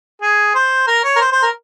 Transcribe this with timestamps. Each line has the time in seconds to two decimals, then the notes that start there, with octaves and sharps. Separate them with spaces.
0.22 G#4
0.55 C5
0.87 A#4
1.04 C#5
1.16 A#4
1.21 C5
1.32 C5
1.42 A#4